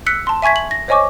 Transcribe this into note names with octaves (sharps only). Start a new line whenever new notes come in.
E6 F#6 B6 C#7
A5 C6
E5 G#5 C#6 G#6 B6
F#7
A#6
C5 C#5 D#5 G#5 C#6 D6